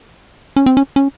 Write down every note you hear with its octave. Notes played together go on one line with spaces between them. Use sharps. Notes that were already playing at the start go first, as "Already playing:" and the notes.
C#4
C4
C#4
C#4